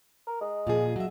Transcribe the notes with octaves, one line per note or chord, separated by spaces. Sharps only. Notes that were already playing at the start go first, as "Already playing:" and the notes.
A#4
G#3
A#2 F3 G#4
F#3 E5